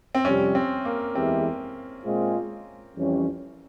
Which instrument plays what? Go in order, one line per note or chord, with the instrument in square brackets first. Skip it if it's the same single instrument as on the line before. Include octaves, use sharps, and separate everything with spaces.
[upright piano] C4
[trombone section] F2 C3 G3 [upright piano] C#4
[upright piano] C4
A#3
[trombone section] E2 E3 G#3 E4 G4 [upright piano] C4
[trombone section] A#2 G#3 C4 F4 G#4
F2 E3 G3 C#4